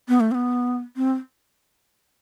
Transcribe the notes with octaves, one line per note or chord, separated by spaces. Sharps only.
B3
A3
C4
B3
C4